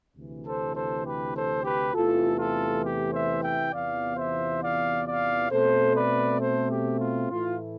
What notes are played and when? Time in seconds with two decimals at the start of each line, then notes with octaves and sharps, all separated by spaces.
0.15 D2 C3 E3
0.45 A4 C5
0.75 A4 C5
1.05 G4 B4
1.34 A4 C5
1.64 G4 B4
1.93 E2 C3 E3 A3 F4 A4
2.39 F4 A4
2.83 G4
3.12 C5 E5
3.43 E5 G5
3.72 E2 C3 E3 B3 F4 D5 F5
4.17 C5 E5
4.62 D5 F5
5.06 D5 F5
5.51 B2 A3 C4 A4 C5
5.96 B4 D5
6.40 A4 C5
6.70 G4
7.00 F4
7.29 A2 E3 A3 E4 F4